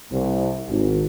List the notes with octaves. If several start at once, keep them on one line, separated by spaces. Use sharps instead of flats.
C2
G#1